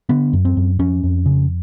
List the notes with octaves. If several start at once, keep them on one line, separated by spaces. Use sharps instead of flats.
D3 B3
F#2
C4
F#2
F2 C#4
F2
C#3